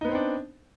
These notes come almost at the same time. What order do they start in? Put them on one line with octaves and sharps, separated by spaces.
D#4 B3 C5 C4 D4